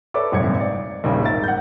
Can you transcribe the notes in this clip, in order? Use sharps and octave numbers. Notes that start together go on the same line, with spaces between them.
A4 B4 C#5 D5 E5 D6
D#1 G#1 F#2 C3 G#6 C#7
D5
A#1 D#2 C#3 G3
G#1 A#4 E5 A6
F#5 G6